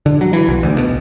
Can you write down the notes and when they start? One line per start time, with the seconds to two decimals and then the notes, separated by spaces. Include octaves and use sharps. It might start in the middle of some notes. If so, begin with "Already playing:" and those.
0.06 D3
0.21 F#3
0.33 E3
0.48 B1
0.63 D2
0.78 B2